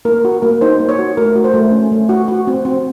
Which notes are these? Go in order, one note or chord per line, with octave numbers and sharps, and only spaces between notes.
A#3 A#4
F#4
A#3 A#4
D#4 C5
A#3
C#5
F#4
A3 A#4
F#4
C5
A3
C#4
A3
F#4
F#4
C4
C4